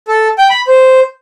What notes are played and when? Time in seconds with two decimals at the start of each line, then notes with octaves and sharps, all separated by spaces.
0.08 A4
0.38 G5
0.50 B5
0.67 C5